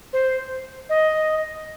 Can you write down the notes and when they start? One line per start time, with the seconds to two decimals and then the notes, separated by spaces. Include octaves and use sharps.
0.13 C5
0.89 D#5